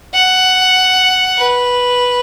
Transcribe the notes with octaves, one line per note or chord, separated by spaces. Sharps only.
F#5
B4